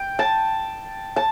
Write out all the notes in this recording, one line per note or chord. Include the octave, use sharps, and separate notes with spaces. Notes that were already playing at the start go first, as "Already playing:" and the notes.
Already playing: G5
A5
A5